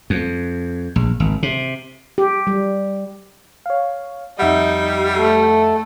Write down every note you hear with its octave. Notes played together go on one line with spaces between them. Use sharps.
F2
A#1
G#1
C3
G4
G3
C#5 F5
F2 G3 D#4 E5 F#5
A3